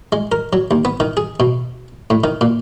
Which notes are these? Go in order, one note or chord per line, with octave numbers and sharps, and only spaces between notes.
G#3
A#4
F#3
D#2
B3
D#3
G#4
B2
A2
D#3
A#2